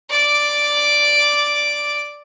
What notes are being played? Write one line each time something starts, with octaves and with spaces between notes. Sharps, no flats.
D5 D6